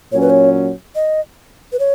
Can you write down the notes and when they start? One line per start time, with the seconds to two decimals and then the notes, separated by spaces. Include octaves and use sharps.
0.12 A#2 F#3 C#4 C#5
0.21 B4
0.30 C#5
0.95 D#5
1.72 B4
1.79 C#5